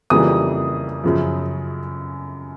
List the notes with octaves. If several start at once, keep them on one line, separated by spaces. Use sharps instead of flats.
F2 C#3 E3 G3 A#3 D#6
F#2 C#3 F3